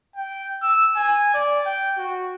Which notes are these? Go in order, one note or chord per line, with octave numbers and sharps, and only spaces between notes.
G5
E6
G#5
D5
G5
F#4